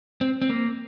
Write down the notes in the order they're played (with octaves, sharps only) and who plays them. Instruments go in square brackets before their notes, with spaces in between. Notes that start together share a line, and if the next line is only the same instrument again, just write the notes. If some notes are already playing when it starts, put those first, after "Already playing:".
[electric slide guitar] C4
C4
A#3